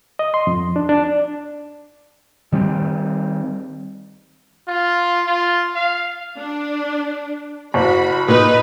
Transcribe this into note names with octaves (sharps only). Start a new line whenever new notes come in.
D#5
C6
F2
D4
D4
D#3 G3 A#3 C4
F4
F4
F5
D4
F#1 F#4 B5
A#2 D#4 B4